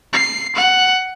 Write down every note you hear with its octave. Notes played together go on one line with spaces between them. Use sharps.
C7
F#5